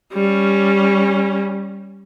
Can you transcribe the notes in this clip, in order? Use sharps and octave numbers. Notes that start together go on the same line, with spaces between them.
G3 C#4